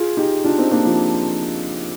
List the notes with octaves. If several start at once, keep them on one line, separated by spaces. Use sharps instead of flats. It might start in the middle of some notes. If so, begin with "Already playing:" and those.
Already playing: F4 G#4
D#4 G4
D4 F4
C4 D#4
A#3 D4
F3